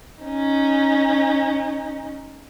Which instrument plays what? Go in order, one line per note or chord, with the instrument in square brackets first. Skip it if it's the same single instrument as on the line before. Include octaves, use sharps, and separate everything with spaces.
[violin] C#4 D#4